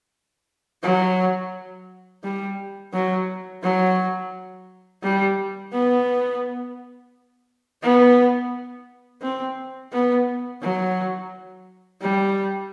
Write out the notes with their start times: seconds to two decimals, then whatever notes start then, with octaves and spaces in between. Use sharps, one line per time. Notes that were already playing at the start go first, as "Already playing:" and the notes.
0.83 F#3
2.24 G3
2.93 F#3
3.63 F#3
5.03 G3
5.72 B3
7.82 B3
9.22 C4
9.93 B3
10.61 F#3
12.01 G3